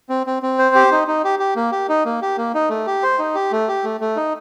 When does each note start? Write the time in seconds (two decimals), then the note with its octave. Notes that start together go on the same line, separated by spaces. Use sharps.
0.09 C4
0.27 C4
0.43 C4
0.59 C5
0.75 G4
0.92 D#4
1.08 D#4
1.24 G4
1.39 G4
1.56 A#3
1.72 G4
1.89 D#4
2.05 A#3
2.22 G4
2.37 A#3
2.54 D#4
2.69 A3
2.87 G4
3.03 C5
3.19 D#4
3.35 G4
3.52 A3
3.68 G4
3.84 A3
4.01 A3
4.16 D#4